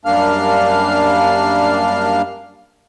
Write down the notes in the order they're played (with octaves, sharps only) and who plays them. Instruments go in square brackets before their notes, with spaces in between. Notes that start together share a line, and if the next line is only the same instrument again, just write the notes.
[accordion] F#2 G3 A#3 D4 F5 F6